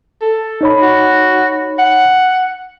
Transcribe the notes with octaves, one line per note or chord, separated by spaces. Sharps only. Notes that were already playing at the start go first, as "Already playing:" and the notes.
A4
D#4 C#5 B5
F#4
F#5